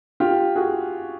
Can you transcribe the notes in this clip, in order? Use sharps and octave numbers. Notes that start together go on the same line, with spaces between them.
F4 G4
F#4 G#4